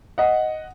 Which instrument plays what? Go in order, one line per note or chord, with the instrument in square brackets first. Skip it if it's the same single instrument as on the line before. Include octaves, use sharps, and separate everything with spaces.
[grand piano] D#5 F#5